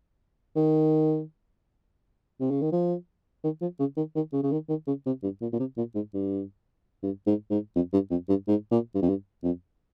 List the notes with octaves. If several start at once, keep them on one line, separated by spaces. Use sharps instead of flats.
D#3
C3
C#3
D#3
F3
D#3
F3
C#3
D#3
D#3
C#3
C#3
D#3
D#3
C#3
C3
G2
A#2
A#2
C3
A#2
G#2
G2
G2
G#2
G#2
F2
G2
F2
G2
G#2
A#2
G2
F2
G2
F2